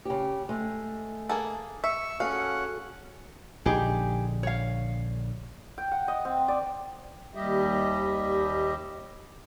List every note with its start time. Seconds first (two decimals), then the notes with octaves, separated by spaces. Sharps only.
0.05 C#3 G4
0.49 G#3 A3
1.29 A#3 G#4 A4
1.84 E5 C#6 E6
2.20 C#4 F#4 G#4 A4 F5 F#5
3.66 A#1 D3 D#4 G4 G#4
4.43 C#5 F5
5.78 G5
5.92 F#5
6.08 D#5
6.25 C4
6.48 D5
7.35 D#2 G3 G4 D#5 E5